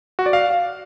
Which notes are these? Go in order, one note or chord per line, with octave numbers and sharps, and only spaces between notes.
F#4
D5
F5